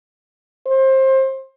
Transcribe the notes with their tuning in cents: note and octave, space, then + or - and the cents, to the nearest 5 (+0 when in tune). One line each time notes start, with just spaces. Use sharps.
C5 +25